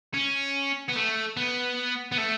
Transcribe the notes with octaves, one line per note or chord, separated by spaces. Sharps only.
C#4
B3
A3
B3
B3
A3